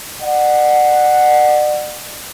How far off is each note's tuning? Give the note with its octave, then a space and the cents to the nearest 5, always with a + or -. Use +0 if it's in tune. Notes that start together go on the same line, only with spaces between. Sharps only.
D5 +35 F#5 +0